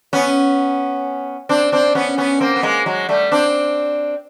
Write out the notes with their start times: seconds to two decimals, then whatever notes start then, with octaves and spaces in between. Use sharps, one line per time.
0.13 B3 C#4
1.49 C4 D4
1.72 C4 D4
1.95 B3 C#4
2.18 B3 C#4
2.40 A#3 C4
2.56 B3
2.63 G#3 A#3
2.86 F#3 G#3
3.09 G3 A3
3.32 C4 D4